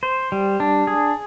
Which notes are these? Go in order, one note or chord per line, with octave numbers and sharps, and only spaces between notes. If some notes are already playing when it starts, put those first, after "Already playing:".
C5
G3
D4
G#4